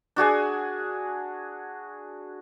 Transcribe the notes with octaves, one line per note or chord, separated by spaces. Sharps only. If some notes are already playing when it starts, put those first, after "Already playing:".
D4 F#4 G#4 G#5